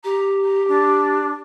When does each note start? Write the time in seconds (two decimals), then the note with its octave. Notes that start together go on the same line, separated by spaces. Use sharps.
0.04 G4 A#5
0.44 A#5
0.68 D4